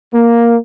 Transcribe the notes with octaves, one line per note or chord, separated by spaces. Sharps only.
A#3